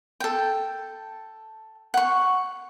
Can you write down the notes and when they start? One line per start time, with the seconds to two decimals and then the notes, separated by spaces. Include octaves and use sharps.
0.20 A4 G5
1.94 F#5 C#6